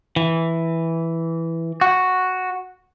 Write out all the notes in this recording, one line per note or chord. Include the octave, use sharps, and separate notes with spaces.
E3
F#4